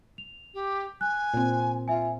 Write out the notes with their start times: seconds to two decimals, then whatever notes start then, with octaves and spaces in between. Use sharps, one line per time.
0.18 F7
0.54 G4
1.01 G#5 F#6
1.34 A#2 C4
1.88 F4 E5 G#5